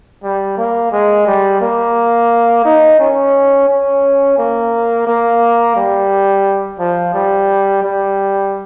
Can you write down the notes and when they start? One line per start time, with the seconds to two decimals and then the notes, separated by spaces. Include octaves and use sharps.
0.23 G3
0.58 A#3
0.92 G#3
1.27 G3
1.61 A#3
2.65 D#4
2.99 C#4
3.68 C#4
4.38 A#3
5.07 A#3
5.76 G3
6.80 F3
7.14 G3
7.83 G3